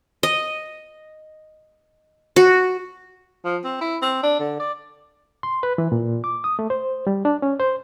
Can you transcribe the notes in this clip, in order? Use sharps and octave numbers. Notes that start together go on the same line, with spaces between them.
D#5
F#4
F3
C4
E4
C4
D4
D3
D5
C6
B4
E3
A#2
D6
D#6
A3
C5
G3
D4
C#4
C5